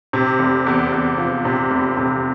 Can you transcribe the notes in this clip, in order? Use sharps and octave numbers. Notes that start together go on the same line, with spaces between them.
C3
F1
E2
E2
F3
C3
F1
C3